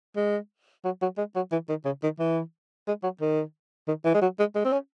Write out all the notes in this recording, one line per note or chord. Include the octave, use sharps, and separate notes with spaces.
G#3
F#3
F#3
G#3
F#3
E3
D#3
C#3
D#3
E3
G#3
F#3
D#3
D#3
E3
G#3
F#3
G#3
G#3
C4
C#4